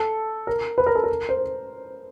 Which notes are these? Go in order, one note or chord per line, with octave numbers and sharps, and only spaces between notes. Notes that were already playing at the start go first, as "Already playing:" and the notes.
Already playing: A4
A#4
B4
A#4
A4
A#4
C5